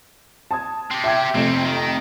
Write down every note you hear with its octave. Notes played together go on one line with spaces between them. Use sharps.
A5 D#6 G#6
C4 G4
E5 G5 G#6
F2 C3 A3 C4 C#4
D#3